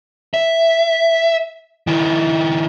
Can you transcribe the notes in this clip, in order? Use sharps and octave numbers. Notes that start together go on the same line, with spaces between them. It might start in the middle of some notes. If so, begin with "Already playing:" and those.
E5
D#3 E4